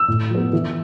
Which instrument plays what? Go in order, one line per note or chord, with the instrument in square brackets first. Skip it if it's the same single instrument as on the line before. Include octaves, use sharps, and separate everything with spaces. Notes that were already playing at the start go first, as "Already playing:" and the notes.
Already playing: [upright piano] E6
[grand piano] A2
F3 B3
E3